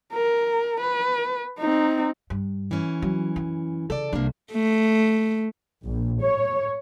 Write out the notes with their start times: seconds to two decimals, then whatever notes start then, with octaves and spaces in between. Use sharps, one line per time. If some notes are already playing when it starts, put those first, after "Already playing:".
0.13 A#4
0.81 B4
1.59 C4 D#4
2.30 G2
2.71 E3 C#4
3.02 F#3
3.36 F#2
3.90 C#3 A4 D5
4.13 C2 A#3 D4
4.52 A3
5.85 A#1
6.22 C#5